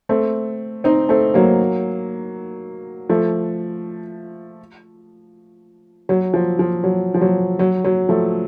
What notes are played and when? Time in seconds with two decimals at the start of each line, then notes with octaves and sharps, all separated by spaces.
0.09 A3 C4
0.84 C4 D#4
1.09 A3 C4
1.34 F#3 A#3
3.09 F3 A3
6.09 F#3
6.34 F3
6.59 F3
6.84 F#3
7.14 F3
7.21 F#3
7.59 F#3
7.84 F#3
8.09 F3 A3